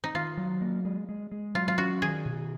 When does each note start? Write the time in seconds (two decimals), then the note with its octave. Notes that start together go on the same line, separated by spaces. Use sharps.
0.04 D#4
0.14 D#3 F4
0.37 F#3
0.61 A#3
0.85 G#3
1.09 G#3
1.32 G#3
1.55 F#3 F4
1.68 F4
1.78 C#4 F#4
2.02 D#3 G#4
2.25 B2